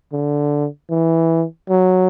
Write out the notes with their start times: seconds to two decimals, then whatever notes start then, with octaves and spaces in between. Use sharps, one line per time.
0.13 D3
0.90 E3
1.69 F#3